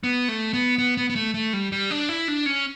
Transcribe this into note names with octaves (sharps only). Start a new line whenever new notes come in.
B3
A3
B3
B3
B3
B3
A3
A3
G3
G3
D4
E4
D4
C#4